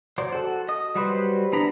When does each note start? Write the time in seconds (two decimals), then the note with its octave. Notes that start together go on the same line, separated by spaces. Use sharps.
0.18 F#3 C5 D5
0.32 F#4 A4
0.69 D#5 D#6
0.95 F#3 G3 F#4 B4 C5
1.52 E3 B3 D4 A#5 B5